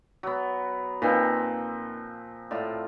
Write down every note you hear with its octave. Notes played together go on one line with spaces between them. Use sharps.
F#3 B3
A#2 F3 A#3 C4 D#4 B4
A2 F4 D5